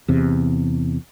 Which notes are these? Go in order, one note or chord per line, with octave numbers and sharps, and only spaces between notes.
E2 C3